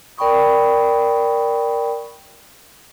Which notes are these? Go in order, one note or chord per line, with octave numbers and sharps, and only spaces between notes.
A#4 D5 G5 B5 C#6 D#6